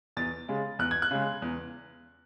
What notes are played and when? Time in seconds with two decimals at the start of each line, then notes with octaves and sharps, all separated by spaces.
0.17 E2 A6
0.48 C#3 G#3
0.79 E2 F#6
0.91 G#6
1.02 F#6
1.11 C#3 G#3
1.42 E2